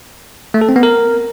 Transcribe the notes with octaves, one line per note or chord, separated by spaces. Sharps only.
A3
A4
C4
B3
A#4